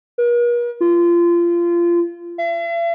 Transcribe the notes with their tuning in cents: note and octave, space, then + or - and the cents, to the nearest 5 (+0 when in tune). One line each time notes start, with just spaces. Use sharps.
A#4 +45
F4 -25
E5 +45